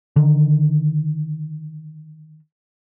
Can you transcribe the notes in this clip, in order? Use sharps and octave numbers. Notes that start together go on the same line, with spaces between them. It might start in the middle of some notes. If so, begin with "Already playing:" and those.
D3 D#3